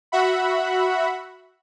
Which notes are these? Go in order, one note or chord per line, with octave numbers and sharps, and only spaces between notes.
F#4 E5 F#5 B5